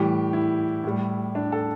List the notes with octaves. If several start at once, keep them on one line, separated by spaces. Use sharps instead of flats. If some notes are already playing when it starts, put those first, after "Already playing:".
Already playing: A2 E3 G3 G4
E4
A2 G3
D4
A4